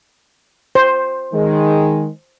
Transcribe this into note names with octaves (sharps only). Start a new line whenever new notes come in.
C5
D#3 G#3